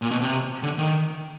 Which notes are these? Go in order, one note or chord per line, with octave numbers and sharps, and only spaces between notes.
A#2
B2
C3
D3
D#3